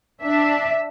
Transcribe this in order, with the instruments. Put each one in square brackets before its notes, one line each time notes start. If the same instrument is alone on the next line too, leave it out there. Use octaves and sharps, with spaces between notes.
[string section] D4 [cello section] E5